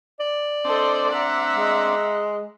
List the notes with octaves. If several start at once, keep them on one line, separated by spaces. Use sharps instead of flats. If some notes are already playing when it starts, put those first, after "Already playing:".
D5
C4 D4 A4 C5 D#5
E5 F#5 A#5
G#3